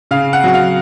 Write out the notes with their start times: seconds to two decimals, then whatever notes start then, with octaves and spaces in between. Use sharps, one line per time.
0.11 C#3 F5
0.33 F#5
0.44 F#3 F#5
0.54 F5